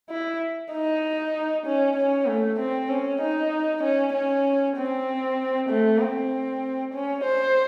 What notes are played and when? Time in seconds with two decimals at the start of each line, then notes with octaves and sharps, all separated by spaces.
0.10 E4
0.73 D#4
1.66 C#4
1.97 C#4
2.28 A3
2.59 C4
2.89 C#4
3.21 D#4
3.83 C#4
4.13 C#4
4.77 C4
5.69 A3
6.00 C4
6.94 C#4
7.24 C5